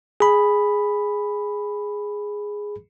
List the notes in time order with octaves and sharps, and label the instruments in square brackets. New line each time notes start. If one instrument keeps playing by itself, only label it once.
[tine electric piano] G#4 B5